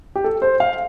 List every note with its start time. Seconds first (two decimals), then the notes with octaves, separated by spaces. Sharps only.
0.16 G4
0.24 A4
0.42 C5
0.60 F5